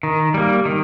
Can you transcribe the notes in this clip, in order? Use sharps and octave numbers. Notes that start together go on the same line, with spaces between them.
D#3
G3 A#3
D#3